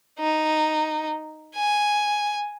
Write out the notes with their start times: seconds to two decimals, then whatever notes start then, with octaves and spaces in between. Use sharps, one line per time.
0.19 D#4
1.55 G#5